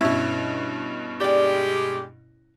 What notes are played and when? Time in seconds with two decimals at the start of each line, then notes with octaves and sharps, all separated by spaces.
0.01 G2 B2 C#4 E4
1.21 G#3 G4 D5 G5